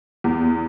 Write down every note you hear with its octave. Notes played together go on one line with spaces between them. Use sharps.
E2